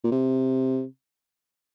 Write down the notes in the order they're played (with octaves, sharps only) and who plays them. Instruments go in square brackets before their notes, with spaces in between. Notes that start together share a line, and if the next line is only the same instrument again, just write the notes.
[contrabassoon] A#2
C3